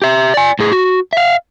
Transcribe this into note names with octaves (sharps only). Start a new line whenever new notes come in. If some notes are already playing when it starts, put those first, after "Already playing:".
G4 E5
D5 G#5
A2 G#4
F#4
E5 F5